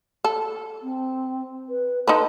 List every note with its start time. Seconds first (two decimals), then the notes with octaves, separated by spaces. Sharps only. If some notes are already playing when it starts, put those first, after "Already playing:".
0.24 A4
0.82 C4
1.69 B4
2.07 D#4 A4 B4 C6